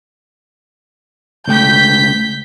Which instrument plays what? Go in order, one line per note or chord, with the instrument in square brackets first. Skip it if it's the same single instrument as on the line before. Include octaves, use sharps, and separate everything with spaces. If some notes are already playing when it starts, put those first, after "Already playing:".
[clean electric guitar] C#2 A3 G5 [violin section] G6 B6